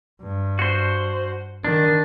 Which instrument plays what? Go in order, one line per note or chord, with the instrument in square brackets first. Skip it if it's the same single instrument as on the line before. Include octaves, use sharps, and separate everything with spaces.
[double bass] G2
[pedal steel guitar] F#4 C5
[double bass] D#3 [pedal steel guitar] D4